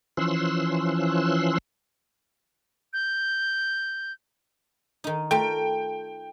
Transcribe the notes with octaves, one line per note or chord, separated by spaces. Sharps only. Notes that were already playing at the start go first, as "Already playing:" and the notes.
E3 F3 C#4 C6 E6 F#6
G6
D#3 D#4
A3 F4 A#4 G5